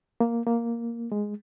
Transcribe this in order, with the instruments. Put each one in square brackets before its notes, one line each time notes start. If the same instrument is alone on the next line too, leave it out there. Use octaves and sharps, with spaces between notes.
[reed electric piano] A#3
A#3
G#3